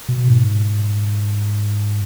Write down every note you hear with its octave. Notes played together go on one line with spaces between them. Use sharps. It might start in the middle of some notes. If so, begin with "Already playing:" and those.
B2
G#2